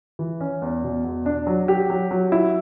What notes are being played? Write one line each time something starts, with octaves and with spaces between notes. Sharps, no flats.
E3
C#4
E2
B2
E2
D4
F#3
G4
F#3
F#3
E4